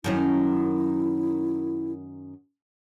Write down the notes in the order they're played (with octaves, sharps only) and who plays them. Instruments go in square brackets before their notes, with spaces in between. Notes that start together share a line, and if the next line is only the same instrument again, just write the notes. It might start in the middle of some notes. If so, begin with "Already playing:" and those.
[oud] F#2 D#3 C#4 [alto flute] E4